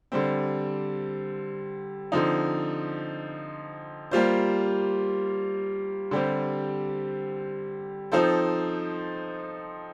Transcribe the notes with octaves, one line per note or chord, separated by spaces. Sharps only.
D3 G3 C4
D3 F3 C4 D#4
G3 A#3 F4 C5
D3 G3 C4 G4
F3 C4 D#4 A4 C5